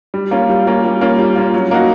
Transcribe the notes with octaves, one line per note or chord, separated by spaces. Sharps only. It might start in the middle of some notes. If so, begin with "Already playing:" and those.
G3
A#3 C#4 F4
G3
A#3 C#4 F4
G3
A#3 C#4 F4
G3
A#3 C#4 F4
F#3
A#3 D#4 F#4